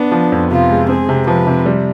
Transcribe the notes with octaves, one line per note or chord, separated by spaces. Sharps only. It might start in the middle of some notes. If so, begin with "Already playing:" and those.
Already playing: B3 D4
F3
F2
C3 F4
G#3
C4 G#4
C3
F3 B4
C3
G3